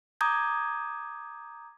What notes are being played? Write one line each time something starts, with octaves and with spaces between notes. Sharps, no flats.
A#5 D6 D#6 G6 G#6